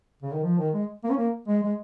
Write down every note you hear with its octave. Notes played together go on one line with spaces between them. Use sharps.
C#3
D#3
F3
D#3
G#3
A#3
C#4
A#3
G#3
G#3